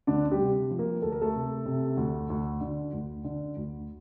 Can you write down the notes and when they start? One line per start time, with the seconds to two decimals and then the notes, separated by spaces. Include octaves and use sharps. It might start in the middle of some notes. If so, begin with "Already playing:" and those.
0.07 D2 D3 D4
0.31 G3 G4
0.40 C3
0.70 F3
0.79 A#3 A#4
1.02 D2 A4
1.12 A#4
1.21 A3 A4
1.35 C3
1.66 C3
1.97 D2
2.30 D2
2.61 D3
2.93 D2
3.24 D3
3.56 D2